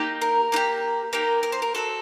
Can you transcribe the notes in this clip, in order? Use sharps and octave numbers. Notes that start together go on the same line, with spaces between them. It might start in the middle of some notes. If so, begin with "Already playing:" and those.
Already playing: A#3 D#4 G4
A#4
A#3 D#4 G4
A#3 D#4 G4 A#4
A#4
C5
A#4
C4 F#4 A4